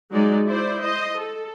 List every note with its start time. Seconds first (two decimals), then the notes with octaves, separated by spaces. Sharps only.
0.12 F#3 G#3 D#4 D5
0.46 E4 C5 D5
0.80 C5 D#5
1.18 A4